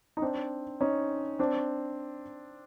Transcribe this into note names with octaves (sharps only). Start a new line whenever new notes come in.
D#4
C4 D4
C#4 D#4
C4 D4